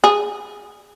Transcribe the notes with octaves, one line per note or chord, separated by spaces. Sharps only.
G#4